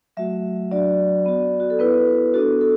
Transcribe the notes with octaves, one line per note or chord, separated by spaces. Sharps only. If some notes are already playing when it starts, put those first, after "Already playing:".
F#3 A3 F#4 E5
F#3 D4 F#4 D5
B3 F#4
F#4
A4
B3 E4 B4
B3 D4 F#4 A4
A4